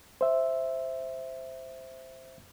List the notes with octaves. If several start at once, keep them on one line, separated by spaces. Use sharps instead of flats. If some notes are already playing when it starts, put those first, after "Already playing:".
C5 E5